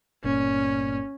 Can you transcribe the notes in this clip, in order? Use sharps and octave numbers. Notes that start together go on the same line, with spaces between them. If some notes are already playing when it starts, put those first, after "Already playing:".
G1 A#2 C#4